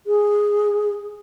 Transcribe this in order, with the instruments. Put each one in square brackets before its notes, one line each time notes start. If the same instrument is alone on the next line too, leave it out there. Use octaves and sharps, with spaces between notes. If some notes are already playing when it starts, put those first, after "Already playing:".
[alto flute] G#4